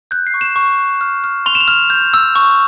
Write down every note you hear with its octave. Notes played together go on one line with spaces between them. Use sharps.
F#6 G6
C7
C#6
E7
C#6
F#6
F6
F6
C6 F7
E7
F7
F6
G6
E6
C#6